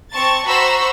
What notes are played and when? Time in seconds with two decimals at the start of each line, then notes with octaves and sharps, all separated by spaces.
0.12 C4 A5 C#6 A6
0.46 F#4 C5 A#5 B5 C#6 E6